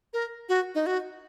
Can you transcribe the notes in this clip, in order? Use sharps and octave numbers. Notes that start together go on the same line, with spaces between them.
A#4
F#4
D#4
F#4